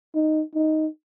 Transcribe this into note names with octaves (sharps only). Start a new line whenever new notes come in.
D#4
D#4